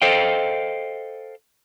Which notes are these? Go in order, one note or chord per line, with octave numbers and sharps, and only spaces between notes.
A4 C5 D#5 F5 G5